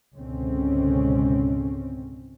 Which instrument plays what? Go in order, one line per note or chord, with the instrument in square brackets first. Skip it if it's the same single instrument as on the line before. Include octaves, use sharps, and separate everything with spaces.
[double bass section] C#2 G#2 B2 D3 C4 C#4